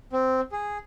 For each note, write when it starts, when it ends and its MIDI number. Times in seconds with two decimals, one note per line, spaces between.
0.13 0.41 60
0.52 0.78 68